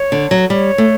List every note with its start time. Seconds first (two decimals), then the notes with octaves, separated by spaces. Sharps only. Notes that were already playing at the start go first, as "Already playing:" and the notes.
Already playing: C#5
0.12 D3
0.31 F#3
0.50 G3 C#5
0.78 A3